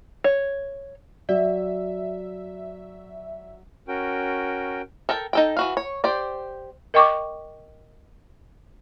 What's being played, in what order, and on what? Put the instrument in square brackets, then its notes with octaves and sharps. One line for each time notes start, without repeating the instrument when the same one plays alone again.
[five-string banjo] C#5
[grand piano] F#3 [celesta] D5 [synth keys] E5
[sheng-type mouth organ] C#4 F#4 A#4 G5
[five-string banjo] A4 A#4 G5 A5
D#4 A4 G5
E3 F#4 F5
C#5
G4 C5 D5
[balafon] A#4 D#5 G5 C#6 D6